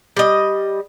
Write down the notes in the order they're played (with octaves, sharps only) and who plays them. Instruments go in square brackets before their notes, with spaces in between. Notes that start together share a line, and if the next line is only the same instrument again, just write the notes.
[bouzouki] G3 D#5